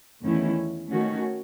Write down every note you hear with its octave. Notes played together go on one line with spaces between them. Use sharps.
E2 D#3 A3 C#4 E4
D#3 A3 C#4 F#4